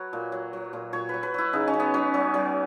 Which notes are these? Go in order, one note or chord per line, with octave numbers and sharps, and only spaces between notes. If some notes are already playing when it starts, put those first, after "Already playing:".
Already playing: F#3 B4 C#5
A#2
F#3
F#3
A#2
A#2 C#5
F#3 B4
B4
F#3 E4
C#3 D#4
C#4
F#3
B3
F#3 C#4
F#3
F#3